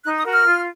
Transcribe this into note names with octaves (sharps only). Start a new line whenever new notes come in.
D#4 F#6
D#6
F#4 A#4
F6
F4